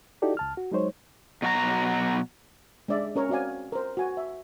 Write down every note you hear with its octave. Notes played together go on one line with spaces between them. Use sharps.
D#4 E4 F#4 G4 A4 D5
C#2 A5 F6
F#4
F#3 G#3 D#4 C5 C#5
B2 F#3 F#4 A#5
G#3 D4 D5 E5
C#4 A#4 C#5
C4 F#4 D5 F5 G#5
A#4 C5
F#4 G#5
E5